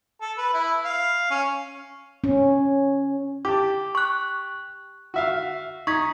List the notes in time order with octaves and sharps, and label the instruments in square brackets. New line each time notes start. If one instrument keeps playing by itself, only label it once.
[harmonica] A4
B4
E4
F5
C#4
[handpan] C#4
[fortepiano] G4 A5 [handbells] D6
[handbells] C#6 F#6
[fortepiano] F#4 E5 F5
[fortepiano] D#4 [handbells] C#6 G#6 B6